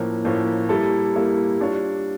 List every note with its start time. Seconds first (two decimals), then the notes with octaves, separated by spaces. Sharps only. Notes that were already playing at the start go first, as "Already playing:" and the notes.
Already playing: A2 F3 A#3 C#4
0.25 A2 F3 A#3 C#4
0.69 G3 A#3 E4 A4
1.15 G3 A#3 E4 A4
1.59 G3 D4 F4 C#5